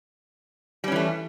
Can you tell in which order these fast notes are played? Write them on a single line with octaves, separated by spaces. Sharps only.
G3 C#4 E3 A3